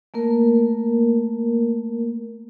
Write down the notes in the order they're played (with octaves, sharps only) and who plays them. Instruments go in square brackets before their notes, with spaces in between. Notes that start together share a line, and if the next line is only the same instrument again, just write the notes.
[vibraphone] A3 A#3 A#4